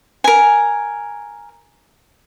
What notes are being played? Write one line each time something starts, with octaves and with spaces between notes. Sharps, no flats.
A#4 G#5